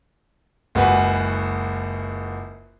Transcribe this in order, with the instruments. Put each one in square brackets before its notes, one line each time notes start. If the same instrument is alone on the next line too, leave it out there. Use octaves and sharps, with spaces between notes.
[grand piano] F#1 C#2 F#4 B4 G#5